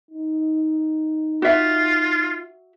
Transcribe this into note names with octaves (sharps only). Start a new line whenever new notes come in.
D#4
F4 F#4 E5